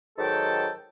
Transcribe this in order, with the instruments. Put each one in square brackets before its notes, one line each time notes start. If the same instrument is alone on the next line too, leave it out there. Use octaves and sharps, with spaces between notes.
[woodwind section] G#2 D#3 F#3 A4 G5 A5